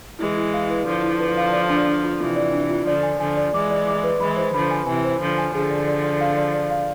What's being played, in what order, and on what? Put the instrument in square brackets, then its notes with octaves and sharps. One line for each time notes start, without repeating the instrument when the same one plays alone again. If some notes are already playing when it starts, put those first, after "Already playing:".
[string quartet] E3 G#3 [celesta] E4
[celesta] E4
F5
B4
[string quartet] D3 F3 [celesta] E4
[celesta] E4
B4
F5
D5
D4
D4
F4
[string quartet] C3 E3 [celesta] F4
[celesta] D5
D4
F4
[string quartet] D3 F3 [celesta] D5
[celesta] G#5
[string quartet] D3 F3 [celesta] G#5
[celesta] D5
[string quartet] E3 G#3 [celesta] D6
[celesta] D5
D6
B4
[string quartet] E3 G#3 [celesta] B5
[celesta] C5
[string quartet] D3 F3 [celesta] B5
[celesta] G#5
[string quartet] C3 E3 [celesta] G#5
[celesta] C5
[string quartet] D3 F3 [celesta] C5
[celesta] G#5
[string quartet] D3 F3 [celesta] G#4
[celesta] D5
D5
D5
F5
D5
D5
F5